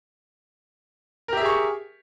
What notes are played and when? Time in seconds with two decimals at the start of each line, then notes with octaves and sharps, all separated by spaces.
1.28 A#4
1.33 G4
1.37 E5
1.41 G#4
1.46 C#6